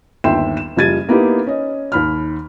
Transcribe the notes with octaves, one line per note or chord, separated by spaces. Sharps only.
G1 D#2 E5 G5 C6 E7
E7
F#1 F3 G3 G#6 A6 D#7
A#3 B3 D#4 E4 G4
C#4 D#5
D#2 B5 F6